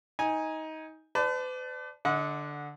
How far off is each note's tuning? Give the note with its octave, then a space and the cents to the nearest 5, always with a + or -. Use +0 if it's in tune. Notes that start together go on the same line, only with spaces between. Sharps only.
D#4 +20 G#5 -10
B4 +45 D5 +0 A5 -5
D3 +0 D#5 +40 F#5 -20